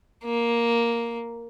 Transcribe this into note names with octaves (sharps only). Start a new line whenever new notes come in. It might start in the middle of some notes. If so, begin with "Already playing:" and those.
A#3